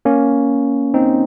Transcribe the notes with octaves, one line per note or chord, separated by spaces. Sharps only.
A#3 C#4
C4 D#4